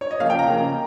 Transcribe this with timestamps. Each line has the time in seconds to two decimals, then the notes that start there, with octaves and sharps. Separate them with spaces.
0.01 C#5
0.11 D#5
0.20 C#3 F3 A#3 F5
0.30 G5
0.39 A#5
0.48 C#3 F3 A#3